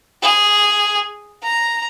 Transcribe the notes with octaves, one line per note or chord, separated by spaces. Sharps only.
G#4
A#5